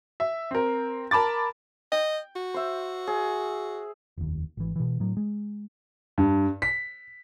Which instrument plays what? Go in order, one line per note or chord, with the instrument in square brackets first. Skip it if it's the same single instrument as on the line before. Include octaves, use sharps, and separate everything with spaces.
[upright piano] E5
C4 A#4
A#4 A5 B5 D6 A6
[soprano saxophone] D#5 [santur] G5
[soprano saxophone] F#4
[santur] C5 E5
G#4
[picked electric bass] F1 D#2
G#1 E3
B2 E3
A2 F#3
G#3
[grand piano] G2
B6